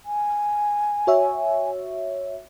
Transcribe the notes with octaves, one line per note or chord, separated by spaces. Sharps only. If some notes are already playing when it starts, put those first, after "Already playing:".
G#5
F#4 C#5 E5